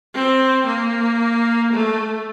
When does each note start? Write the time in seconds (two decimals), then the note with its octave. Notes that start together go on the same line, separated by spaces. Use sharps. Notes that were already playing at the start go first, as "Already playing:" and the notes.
0.15 C4
0.67 A#3
1.72 A3